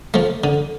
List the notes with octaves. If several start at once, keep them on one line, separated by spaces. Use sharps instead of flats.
F3 A3
D3